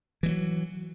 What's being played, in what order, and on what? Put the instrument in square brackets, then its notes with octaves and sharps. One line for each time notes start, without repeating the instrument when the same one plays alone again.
[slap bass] E3
G3
F#3